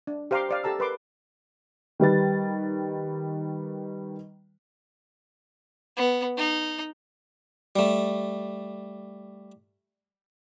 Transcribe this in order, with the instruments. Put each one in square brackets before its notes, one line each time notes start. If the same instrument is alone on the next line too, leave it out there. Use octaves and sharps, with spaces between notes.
[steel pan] D4
G4 C5 F5 A#5 C6 D6
C5 D5 F5
G4 A4 A5 A#5 E6
A#4 B4 C6 D6
[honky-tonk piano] D#3 G3 B4 A6
[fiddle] B3
D#4
[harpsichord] G3 A3